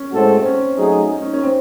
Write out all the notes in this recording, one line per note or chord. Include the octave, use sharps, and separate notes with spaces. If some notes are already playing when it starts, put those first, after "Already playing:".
Already playing: C#4
A2 G#3 C4 F#4 A4
C4
C#4
F#3 A3 D#4 G#4
D#4
C#4
C#4
C4